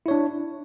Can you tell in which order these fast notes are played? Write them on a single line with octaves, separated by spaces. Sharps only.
E4 C#5 D4